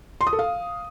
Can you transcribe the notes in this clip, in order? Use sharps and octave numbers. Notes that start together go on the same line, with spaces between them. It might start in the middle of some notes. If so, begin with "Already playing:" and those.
C6
D#6
A4
F5